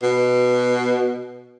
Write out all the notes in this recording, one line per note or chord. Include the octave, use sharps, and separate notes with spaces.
B2